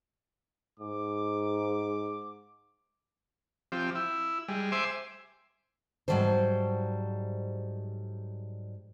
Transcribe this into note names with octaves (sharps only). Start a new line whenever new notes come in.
G#2 D6
F3 C4 G4
E4
G3 G#3
C5 E5 G#5 C6 D6
G#2 C3 F#3 G3 A4 C5